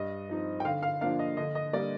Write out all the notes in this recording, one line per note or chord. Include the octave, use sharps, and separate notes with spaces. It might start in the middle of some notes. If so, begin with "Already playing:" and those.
Already playing: G2 D#5
F3 C4 D#4
G5
D3 F5
F5
F3 A#3 D4 F5
D#5
D3 D#5
D#5
G3 A#3 D5